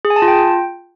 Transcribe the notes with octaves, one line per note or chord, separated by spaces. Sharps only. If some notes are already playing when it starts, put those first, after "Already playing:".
G#4
G#5
A5
F4
G5